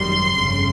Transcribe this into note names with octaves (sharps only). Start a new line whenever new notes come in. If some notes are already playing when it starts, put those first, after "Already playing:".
Already playing: G#1 F#2 D#3 G3 C6
G1 F2 C#3